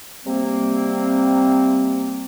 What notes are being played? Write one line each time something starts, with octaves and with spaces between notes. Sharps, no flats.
C3 G3 A#3 C4